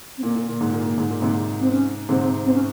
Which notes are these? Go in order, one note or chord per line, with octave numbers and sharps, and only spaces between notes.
C4
A#2 A#3
A#2
A#2
G#2
A#2
A#2
G#2
A#2
G#2 C3
C4
C#4
G#2 C3 C4
C4
C#4